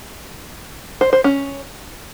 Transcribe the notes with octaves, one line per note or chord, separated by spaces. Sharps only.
C5
C5
C#4